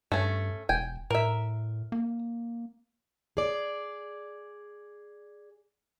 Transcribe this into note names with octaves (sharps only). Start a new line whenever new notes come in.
G2 A3 C#4
E1 G5 G#5
A2 A#4 E5
A#3
G#4 D5